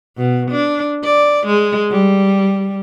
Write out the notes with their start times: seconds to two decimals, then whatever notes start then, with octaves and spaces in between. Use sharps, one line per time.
0.17 B2
0.51 D4
1.04 D5
1.46 G#3
1.91 G3